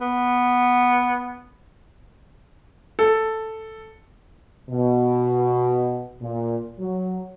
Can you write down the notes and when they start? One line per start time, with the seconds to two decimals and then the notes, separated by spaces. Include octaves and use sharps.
0.01 B3
2.99 A4
4.70 B2
6.22 A#2
6.80 F#3